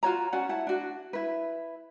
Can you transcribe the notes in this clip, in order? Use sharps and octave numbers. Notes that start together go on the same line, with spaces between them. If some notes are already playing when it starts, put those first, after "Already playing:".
F4 F#4 C#5 A#5
C#4 F#4 D5 F#5
E4 F#5 A5
D4 F#4
E4 B4